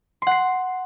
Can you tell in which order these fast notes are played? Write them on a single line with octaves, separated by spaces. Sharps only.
C6 F#5 C7